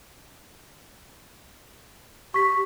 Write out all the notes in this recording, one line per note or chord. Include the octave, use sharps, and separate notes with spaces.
G4 C#6 B6